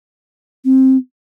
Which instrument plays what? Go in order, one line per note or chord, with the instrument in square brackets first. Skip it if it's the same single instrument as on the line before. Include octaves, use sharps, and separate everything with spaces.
[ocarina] C4